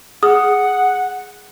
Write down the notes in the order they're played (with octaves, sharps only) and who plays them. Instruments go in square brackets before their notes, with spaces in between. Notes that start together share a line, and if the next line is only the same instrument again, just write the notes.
[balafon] G#4 [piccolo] F#5 [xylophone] D#6